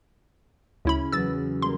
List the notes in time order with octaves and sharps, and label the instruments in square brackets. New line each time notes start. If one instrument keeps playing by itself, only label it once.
[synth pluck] D2 E4 B5 [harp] C#3 C#4
[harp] E2 F#3 [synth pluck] E6 A6
[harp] G3 A#3 [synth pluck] C6